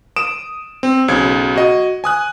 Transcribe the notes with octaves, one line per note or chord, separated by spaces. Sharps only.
D#6 D7 E7
C4
B1 C#3 G#6
F#4 D#5
G#5 D#6 F#6